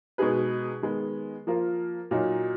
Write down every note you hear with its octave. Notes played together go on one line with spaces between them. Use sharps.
B2 G#3 D#4 G#4 B4
D#3 G#3 B3
F3 A#3 F4 A#4
A#2 F#3 A#3 D#4